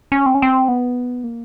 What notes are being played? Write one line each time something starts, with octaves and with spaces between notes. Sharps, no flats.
C#4
C4
C#4
C4
B3
A#3